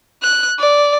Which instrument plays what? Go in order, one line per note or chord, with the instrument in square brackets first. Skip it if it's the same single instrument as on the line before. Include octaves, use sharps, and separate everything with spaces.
[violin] F#6
D5